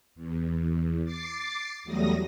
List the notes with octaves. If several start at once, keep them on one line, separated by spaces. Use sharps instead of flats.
E2
D6 A6 C7
E2 F#3 G3 A3 D#6 A#6